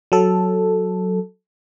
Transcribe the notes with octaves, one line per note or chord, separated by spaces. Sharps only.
F#3 A4